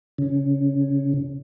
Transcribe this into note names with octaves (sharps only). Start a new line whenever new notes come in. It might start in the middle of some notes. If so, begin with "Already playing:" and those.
C#3